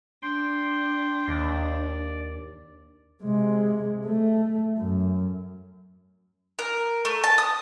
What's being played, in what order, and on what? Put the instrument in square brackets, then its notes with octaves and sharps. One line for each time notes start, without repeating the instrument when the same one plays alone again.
[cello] D4 [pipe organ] G5 C6
[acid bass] D#2 [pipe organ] D5
[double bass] C3 G#3
A3
F#2
[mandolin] A#4
A3
A5
D#6